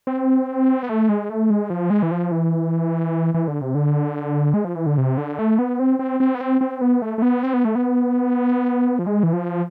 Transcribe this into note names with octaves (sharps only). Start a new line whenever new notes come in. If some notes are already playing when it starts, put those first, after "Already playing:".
C4
B3
A3
G#3
A3
G#3
F3
G#3
E3
F3
E3
E3
D3
C3
D3
G#3
F3
E3
D3
C3
D3
A3
B3
C4
C4
C4
B3
C4
C4
B3
A3
A3
B3
C4
B3
A3
B3
F3
G#3
E3
F3